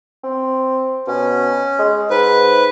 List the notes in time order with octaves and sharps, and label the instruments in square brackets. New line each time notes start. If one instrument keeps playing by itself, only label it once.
[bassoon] C4
[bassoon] B2 [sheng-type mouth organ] C#4
[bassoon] G#3
[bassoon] G#2 [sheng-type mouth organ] B4